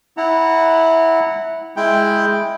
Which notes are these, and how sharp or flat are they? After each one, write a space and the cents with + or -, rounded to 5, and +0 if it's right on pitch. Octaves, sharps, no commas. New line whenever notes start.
E4 -15 F#5 +0 A#5 -30
G#3 +0 E4 -5 G5 +0